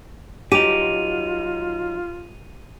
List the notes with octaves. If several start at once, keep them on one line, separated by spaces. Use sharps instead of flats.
F#3 D#4 F4 G4 D#7 F7